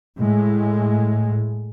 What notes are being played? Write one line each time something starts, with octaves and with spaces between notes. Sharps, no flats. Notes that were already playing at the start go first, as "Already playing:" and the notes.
A2 G#3